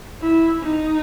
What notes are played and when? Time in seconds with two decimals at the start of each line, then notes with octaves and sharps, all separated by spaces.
0.22 E4
0.63 D#4